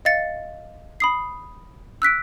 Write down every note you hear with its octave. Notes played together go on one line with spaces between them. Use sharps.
D#5 F5 A6 C#7
B5 D#6 C7
E6 F#6 B6 D7